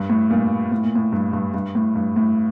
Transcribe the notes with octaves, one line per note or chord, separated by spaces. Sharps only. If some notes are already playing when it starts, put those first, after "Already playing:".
Already playing: G2
A2
G2 A#2
A2
A#2
A2
G2
G2
G2
A2
G2
A2